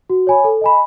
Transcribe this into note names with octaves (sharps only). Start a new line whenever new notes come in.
F#4
C#5 G#5 B5
A4
D#5 G#5 B5